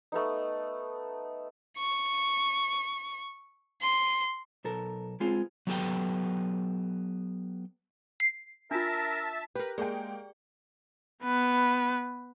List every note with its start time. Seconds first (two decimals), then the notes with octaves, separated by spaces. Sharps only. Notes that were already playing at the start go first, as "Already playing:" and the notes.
0.12 A3 B3 D#4
1.78 C#6
3.82 C6
4.64 B1 A4 A#4
5.20 G#3 C4 F4 G#4
5.67 F#3 B3 G4 A4 B4 G5
8.20 C7
8.71 D4 F4 A#4 E5 A5
9.55 G4 A#4 B4
9.78 G#3 A#3 G#4 D5 G5
11.24 B3 B4